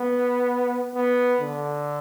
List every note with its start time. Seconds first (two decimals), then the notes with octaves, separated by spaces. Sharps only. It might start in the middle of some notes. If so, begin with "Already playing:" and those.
Already playing: B3
0.95 B3
1.41 D3